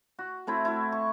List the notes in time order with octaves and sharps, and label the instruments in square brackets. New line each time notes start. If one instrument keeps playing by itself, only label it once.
[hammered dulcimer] F#4
A3 C4 E4
E4 F#4
C#6